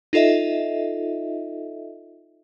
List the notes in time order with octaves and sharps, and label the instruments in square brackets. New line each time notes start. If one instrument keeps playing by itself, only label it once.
[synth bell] D#4 F4 A4 D#5 E5